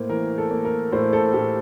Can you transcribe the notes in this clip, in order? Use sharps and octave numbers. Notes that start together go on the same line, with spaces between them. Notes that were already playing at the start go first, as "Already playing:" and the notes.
Already playing: A2 A#3 C5
E3 A#4
A4
A#3
A#4
A2 C5
A4
A2 G4